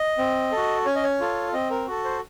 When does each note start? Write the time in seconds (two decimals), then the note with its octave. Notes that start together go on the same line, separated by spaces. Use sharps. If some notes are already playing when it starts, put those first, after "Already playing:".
Already playing: D#5
0.18 C4
0.52 F#4 A4
0.86 C#4 C#5
0.96 D#5
1.03 C#5
1.20 F4 A4
1.53 C4 D#5
1.70 A#4
1.87 F#4 A4
2.04 C5